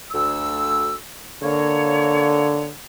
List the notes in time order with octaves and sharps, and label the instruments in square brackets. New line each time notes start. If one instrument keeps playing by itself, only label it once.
[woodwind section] D2 E6
[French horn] D3 [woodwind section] A#3 C#5